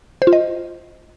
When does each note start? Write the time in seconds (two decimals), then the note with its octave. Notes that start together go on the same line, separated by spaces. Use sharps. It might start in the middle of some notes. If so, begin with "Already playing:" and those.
0.22 C5
0.27 F4
0.33 D#5